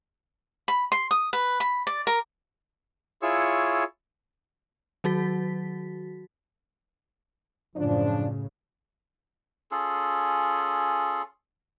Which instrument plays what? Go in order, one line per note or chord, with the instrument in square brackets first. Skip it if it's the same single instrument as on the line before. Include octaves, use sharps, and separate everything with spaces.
[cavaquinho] B5
C6
D#6
B4
B5
D5
A#4
[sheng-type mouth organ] E4 F4 G#4 C#5 C#6 E6
[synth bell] D#3 F#3 F#4 B6
[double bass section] F#2 A2 C#3 [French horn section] F3 D4
[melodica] C#4 F4 G#4 A4